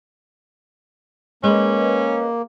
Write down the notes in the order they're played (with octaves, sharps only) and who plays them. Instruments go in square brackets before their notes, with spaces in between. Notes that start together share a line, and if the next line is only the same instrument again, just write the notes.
[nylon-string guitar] G#3 [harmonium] A#3 [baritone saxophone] C#4 [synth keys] B4 D#5